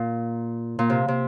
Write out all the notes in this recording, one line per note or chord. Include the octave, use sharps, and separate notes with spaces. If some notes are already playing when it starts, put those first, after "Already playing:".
Already playing: A#2
A#2
C3
C3